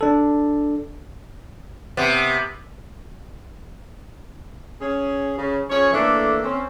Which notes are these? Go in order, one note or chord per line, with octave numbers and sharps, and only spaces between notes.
D4 A4
C3 B3
C#4 G#4
C#3
F3 C#4 G#4 C#5
E3 A3 A#3 D4 A4
C4 C#4